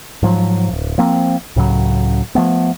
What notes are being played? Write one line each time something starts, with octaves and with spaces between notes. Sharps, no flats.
G#2 F3 F#3
D1
F3 A#3 C4
C#2 A2 C#3 F#3
F3 A3 B3